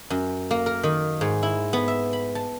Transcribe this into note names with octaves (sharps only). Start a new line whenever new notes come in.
F#2
A#3
A#4
D#3
G#2
E4
B3
E5
B5
A5